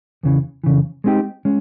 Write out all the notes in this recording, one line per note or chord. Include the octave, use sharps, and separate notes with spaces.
E2 C#3 E3
F2 C#3 E3
G#3 C4 D#4 G4
G#3 C#4